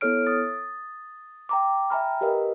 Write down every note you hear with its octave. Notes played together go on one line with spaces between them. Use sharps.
B3 E4 A4 C#5 F6 D7
D#6 A6
G5 A#5 D6
E5 G5 G#5 A#5 B5 F6
G4 A#4 B4 D#5 F5